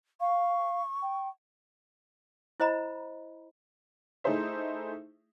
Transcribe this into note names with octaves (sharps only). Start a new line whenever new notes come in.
F5 C#6
G5
E4 C5 D#5 A#5 B5
A3 D#4 E4 G#4 C5 E5